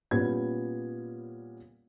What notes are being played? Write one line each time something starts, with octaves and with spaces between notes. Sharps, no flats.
A#2 G3 B3 C#4 G#6